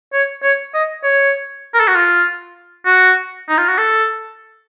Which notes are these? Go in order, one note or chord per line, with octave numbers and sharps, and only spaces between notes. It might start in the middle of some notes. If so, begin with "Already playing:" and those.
C#5
C#5
D#5
C#5
A#4
A4
F#4
F4
F#4
D#4
F4
F#4
A4